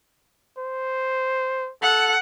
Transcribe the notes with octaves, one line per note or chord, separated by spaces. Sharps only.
C5
A4 F#5